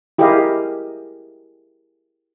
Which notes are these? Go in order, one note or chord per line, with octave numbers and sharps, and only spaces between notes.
E4 G4 G#4 A#4 D#5 F5